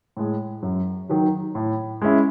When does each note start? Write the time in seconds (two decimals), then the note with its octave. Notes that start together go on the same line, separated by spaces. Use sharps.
0.17 A2 G#3
0.62 F#2
1.09 D#3 F#3
1.55 A2
2.02 G#3 C#4 E4